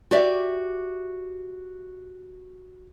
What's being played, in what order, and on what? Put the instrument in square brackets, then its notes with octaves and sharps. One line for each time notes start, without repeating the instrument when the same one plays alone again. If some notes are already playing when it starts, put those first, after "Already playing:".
[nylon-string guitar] F#4 G4 D5 E5